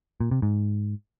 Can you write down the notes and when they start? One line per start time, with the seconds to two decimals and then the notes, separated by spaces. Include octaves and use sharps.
0.20 A#2
0.31 C3
0.42 G#2